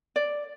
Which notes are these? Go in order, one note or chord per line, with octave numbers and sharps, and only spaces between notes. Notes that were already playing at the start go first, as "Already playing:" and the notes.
D5